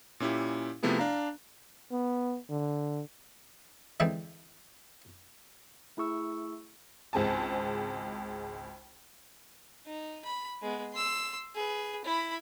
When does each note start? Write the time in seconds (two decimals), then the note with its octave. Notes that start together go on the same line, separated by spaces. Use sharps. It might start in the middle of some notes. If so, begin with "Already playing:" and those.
0.20 A#2 C#4 E4 G4
0.83 C3 F3 A3 B3 E4 G#4
0.99 D4 F5 A#5
1.92 B3
2.50 D3
4.00 D3 E3 G#3 C4 D#4
5.97 A3 E4 G#4 C#6 E6
7.13 G#1 C#2 G#3 C4 G#5 A5
9.86 D#4
10.25 B5
10.62 G#3 B3
10.94 C6 E6
11.55 G#4 B4
12.05 E4 B5